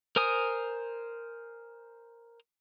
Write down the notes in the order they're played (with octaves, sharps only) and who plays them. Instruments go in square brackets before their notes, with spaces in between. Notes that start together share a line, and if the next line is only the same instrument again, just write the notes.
[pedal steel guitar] A#4 C5 G#5 D#6